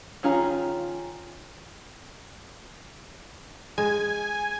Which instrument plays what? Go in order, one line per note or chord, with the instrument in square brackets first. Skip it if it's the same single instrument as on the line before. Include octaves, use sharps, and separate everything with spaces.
[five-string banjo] D#3 C#4 F4 G#4 A#5
[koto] G#3 [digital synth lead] G#5